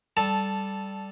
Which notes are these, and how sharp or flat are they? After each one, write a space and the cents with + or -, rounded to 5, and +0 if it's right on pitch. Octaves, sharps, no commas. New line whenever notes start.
G3 +0 A4 -10 A5 +0